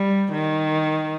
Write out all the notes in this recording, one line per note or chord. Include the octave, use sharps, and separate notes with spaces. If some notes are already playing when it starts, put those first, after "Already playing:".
Already playing: G3
D#3